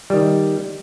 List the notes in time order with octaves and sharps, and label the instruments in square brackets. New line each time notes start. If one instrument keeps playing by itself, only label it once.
[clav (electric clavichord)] D#3 G3